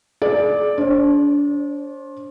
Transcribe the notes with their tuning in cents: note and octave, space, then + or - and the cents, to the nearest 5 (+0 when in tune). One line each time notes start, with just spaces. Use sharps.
G#4 +45 D5 +0
D4 -30 C5 +30